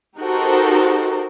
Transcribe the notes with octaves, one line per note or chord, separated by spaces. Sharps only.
D#4 F#4 G4 A4 A#4 C5